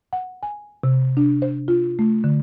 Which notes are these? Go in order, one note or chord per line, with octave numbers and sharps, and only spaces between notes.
F#5
G#5
C3
D4
C5
F4
A3
D3